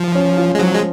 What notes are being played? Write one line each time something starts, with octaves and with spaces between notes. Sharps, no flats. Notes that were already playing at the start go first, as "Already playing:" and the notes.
Already playing: F3
C#4
F4
G#3
F3 F#3
G#3